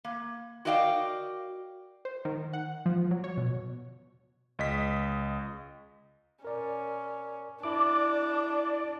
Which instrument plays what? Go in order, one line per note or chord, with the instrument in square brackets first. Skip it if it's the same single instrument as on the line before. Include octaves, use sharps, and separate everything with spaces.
[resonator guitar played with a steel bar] A#3
F#4 A#4 D5 D#5 F5 G5
[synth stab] C5
D#3
F#5
F3
F#3
C#5
B2
[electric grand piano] C#2 D#5 B6
[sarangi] C#4 [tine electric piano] A#4 D5
[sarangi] D4 [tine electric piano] E4 D6 [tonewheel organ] D5